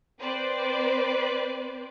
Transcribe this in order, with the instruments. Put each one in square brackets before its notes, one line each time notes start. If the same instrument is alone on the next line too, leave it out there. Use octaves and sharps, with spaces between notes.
[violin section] C4 B4 C5 D5